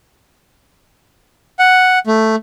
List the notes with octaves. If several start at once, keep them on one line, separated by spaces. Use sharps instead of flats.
F#5
A3